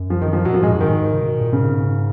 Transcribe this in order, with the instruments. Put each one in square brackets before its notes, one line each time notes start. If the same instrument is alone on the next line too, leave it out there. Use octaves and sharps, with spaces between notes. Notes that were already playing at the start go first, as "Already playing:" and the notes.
Already playing: [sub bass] F#2
[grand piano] F3
D#3
F3
[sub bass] A#2 [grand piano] F#3
[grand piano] F3
[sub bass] G#2 [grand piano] G#3
[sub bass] F#2 [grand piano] F#3
[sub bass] G#2 [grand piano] D#3
[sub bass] C#3
B2
B2
A#2
[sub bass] G#2 [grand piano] C#3